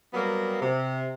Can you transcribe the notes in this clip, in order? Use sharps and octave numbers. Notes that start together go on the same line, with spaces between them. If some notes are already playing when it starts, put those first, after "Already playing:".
F#3 G3 A#3 B3
C3